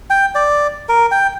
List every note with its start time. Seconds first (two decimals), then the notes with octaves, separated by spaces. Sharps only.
0.10 G5
0.35 D5
0.89 A#4
1.11 G5